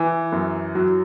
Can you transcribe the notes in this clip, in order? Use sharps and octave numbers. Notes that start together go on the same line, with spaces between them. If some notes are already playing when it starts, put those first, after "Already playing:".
Already playing: E3
F#2
F#3